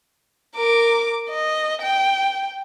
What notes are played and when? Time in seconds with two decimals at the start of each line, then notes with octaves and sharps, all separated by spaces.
0.55 A#4 D6
1.30 D#5
1.82 G5